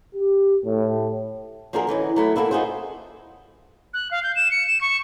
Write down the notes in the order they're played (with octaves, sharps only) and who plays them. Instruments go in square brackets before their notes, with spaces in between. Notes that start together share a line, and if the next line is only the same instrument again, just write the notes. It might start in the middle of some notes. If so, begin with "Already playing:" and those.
[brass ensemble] G4
A2
[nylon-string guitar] F3 A#3 D4 F#4 G#4 A#4
D3 E3 C#4 D#4
F#3 A3 E4
A#3 E4 F#4 G#4 A4
A#3 D#4 F4 F#4 G#4 C5
[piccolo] F#6
F5
G6
E7
C#7
E7
C#6